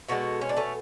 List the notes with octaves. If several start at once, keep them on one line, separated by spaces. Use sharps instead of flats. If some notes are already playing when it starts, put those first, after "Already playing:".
B2 G#3 F#4 A4
C#4
D4
A3 C#4